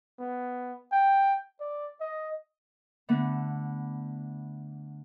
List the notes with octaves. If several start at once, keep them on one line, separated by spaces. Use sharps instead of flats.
B3
G5
D5
D#5
D3 A3 B3